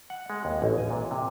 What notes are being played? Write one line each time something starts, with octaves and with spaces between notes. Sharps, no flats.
F#5
G#3
D#2
A1
G#5
A#2
C3